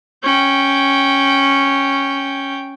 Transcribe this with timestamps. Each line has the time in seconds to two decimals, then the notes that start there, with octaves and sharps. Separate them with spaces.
0.23 C#4 G5